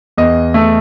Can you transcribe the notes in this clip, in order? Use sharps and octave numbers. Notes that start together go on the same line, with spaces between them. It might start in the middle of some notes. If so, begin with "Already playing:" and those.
E2 D#5
A3